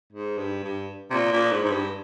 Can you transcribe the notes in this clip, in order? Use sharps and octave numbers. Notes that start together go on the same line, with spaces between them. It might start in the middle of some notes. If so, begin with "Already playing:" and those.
G#2
G2
G2
C3
A#2
A#2
G#2
G#2
G2